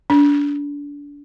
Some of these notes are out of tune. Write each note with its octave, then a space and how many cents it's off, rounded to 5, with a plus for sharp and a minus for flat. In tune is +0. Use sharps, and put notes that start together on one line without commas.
D4 -30